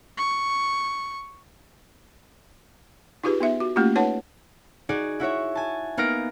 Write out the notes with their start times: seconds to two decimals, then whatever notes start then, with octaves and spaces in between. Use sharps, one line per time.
0.17 C#6
3.24 D#4 F4 G4 G#4 B4
3.40 B3 D#4 E5
3.60 F#4
3.76 A3 A#3 C#4 F4 G4
3.96 D#4 B4 C#5 F#5 A5
4.89 D#4 F#4 G#4 D5
5.20 E4 F#4 C#5 E5
5.55 G#5 A5
5.97 A#3 B3 D#4 F6 A#6 D7